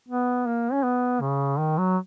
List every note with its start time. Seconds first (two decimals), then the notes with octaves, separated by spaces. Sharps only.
0.09 B3
0.47 A#3
0.73 C#4
0.84 B3
1.21 C#3
1.59 D#3
1.78 F#3